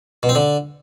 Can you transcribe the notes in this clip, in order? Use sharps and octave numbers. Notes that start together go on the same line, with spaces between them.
B2
C4
D3